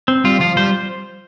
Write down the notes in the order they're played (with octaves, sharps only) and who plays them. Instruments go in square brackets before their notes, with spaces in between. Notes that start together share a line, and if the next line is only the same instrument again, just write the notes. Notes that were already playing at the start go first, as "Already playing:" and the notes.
[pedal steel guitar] C4
[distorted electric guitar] G3 [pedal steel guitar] F4
[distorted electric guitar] F3 [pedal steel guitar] F4
[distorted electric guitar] G3 [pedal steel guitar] C5